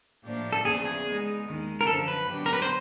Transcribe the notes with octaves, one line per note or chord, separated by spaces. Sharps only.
A2 F3 A#3 D4 G4
A4
E2 C#3 F3 A#3 D4 G#4
G#4
G#3 B3 D#4
D#2 D#3 G#3
A#4
F#2 D3 F3 A4
B4
D3 F#3 B3 D4 G4
A#4
B4
C5